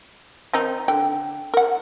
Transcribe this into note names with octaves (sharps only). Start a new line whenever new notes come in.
D#3 C4 D#4
D3 G5
A#4 F#5